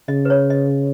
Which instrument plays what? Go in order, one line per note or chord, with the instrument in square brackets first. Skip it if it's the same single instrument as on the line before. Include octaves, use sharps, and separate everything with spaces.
[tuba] C#3 [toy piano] D#5
[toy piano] B4
C#5
D#5